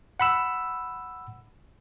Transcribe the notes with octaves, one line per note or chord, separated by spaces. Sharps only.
F#5 B5 E6